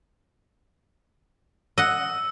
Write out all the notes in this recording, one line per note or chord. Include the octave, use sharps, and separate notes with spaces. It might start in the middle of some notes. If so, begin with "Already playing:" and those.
D#5 F#5 E6